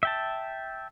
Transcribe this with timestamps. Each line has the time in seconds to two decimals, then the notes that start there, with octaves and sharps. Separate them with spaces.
0.03 E5 G5 A5